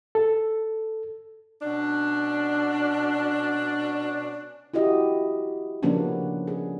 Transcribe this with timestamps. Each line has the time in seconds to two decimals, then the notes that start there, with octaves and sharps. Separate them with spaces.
0.15 A4
1.62 B2 C#4 D4
4.74 E4 F#4 G4 D#5
5.83 C#3 F3 A#3 B3 C#4 D4
6.48 G#4